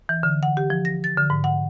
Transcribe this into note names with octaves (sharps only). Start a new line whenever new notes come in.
E3
D3
F#5
G4
F3
A#6
A6
D3
G#2
F#5